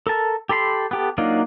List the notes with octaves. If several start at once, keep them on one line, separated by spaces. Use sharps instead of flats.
A4 A#4 A5
G4 A4 B5 C6
B3 G4 A4
F#3 A#3 D4 D#4 F4